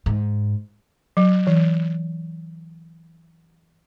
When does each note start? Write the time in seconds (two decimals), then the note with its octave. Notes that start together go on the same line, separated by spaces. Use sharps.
0.06 G#2
1.17 F#3
1.47 E3